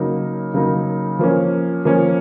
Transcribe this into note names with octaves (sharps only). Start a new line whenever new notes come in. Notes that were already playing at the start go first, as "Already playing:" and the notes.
Already playing: C#3 F#3 A#3 D#4
C#3 F#3 A#3 D#4
F3 A#3 C#4
F3 A#3 C#4